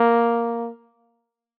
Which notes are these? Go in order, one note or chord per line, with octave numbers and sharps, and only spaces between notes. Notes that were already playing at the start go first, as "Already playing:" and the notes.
Already playing: A#3